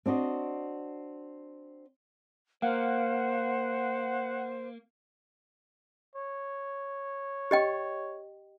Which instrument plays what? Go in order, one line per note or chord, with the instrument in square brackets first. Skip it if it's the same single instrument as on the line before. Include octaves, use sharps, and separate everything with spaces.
[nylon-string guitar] C4 D4 F#4 D#5
[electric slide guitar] A#3 [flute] C5 [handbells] F5 [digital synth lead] F#5
[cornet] C#5
[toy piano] G4 D#5 G5